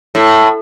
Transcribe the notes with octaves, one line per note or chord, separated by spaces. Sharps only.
A2